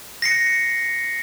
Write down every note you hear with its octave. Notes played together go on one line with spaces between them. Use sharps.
A#6 C7 C#7